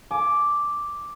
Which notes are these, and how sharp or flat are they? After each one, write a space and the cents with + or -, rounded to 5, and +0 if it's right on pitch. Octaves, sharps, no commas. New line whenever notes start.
G#5 +30 D6 +0